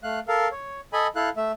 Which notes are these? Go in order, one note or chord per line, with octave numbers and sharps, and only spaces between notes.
A3 F5 F#6
A4 A#4 F5
C#5
A4 D#5 G#5 B5
E4 A4 F5 F#6
A3 E5